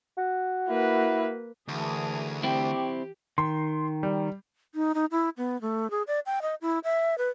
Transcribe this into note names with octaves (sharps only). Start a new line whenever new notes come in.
F#4
A#3 E4 B4
D2 E3 G#4 A#4 A5 D6 D#6
C4 E4 G4 G5 C#6 D6
D#3 C6
G3
D#4
D#4
E4
B3
A3
G#4
D5
G5
D#5
E4
E5
B4